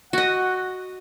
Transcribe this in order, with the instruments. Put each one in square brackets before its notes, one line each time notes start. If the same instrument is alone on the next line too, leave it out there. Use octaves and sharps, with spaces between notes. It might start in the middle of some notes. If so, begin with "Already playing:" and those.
[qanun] F#4 D#5 [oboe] F#5